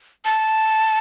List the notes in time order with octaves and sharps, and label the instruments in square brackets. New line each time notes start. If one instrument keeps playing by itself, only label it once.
[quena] A5